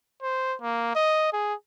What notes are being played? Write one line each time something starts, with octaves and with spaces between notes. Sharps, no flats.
C5
A#3
D#5
G#4